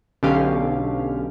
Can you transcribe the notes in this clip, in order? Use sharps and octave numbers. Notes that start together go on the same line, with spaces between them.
B1 D3 C#4 G4 F5